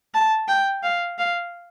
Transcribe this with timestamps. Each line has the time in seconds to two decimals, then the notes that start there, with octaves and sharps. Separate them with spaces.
0.14 A5
0.48 G5
0.83 F5
1.19 F5